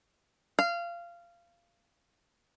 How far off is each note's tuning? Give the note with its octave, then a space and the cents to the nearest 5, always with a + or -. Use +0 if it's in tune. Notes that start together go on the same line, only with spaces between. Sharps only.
F5 -20